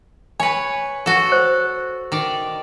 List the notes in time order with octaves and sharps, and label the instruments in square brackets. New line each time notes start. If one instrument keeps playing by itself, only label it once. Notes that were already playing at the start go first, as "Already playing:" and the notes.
[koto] B4 C#5 [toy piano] G#5
[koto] F#4 A4
[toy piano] C5
[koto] D#3 D5